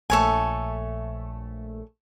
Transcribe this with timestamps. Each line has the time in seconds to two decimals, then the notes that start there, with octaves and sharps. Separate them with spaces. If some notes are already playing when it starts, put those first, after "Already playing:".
0.10 A#1 A3 A4 C#5 G#5